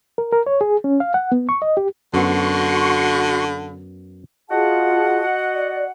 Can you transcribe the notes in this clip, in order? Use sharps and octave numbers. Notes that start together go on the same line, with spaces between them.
A#4
A#4
C#5
G#4
C#4
F5
F#5
B3
C#6
D#5
G4
F#2 D3 B3 F#4 C6 C#6
F4 F#4 G#4 D#5 F#5 A5
D5